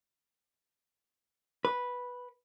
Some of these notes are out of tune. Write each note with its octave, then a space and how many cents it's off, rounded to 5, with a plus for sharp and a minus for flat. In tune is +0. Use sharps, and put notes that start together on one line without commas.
B4 -5